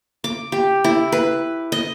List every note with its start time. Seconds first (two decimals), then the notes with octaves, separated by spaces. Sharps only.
0.24 D6
0.52 G4
0.84 E4
1.12 B4
1.72 D#5